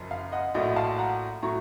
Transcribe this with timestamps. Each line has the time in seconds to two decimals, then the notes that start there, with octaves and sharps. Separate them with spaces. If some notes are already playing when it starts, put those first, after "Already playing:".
Already playing: F#1 F#2 F3
0.11 F5
0.32 D#5 F#5
0.55 A#1 A2 F#3 D#5 F#5
0.76 F5 A5
0.98 F#5 A#5
1.42 A2 F#3 A#5 C#6